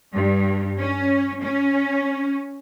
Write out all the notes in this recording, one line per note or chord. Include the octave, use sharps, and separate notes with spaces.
G2
C#4
C#4